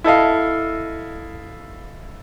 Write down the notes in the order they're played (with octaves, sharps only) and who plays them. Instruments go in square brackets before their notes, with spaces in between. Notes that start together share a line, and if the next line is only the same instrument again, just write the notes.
[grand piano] E4 A4 D#5 F5